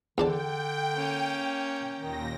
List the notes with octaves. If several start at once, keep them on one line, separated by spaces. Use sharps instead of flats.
E2 D3 D4 G5 A5
A#3 C#4
D#2 A#2 D#3 A#6